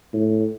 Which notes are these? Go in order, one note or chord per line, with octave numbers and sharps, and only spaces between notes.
A2